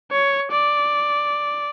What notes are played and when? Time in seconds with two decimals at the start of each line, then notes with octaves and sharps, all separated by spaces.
0.12 C#5
0.52 D5